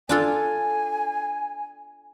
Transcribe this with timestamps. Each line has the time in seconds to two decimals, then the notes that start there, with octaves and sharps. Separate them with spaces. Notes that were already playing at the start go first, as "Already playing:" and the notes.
0.09 D4 F4 A4 G#5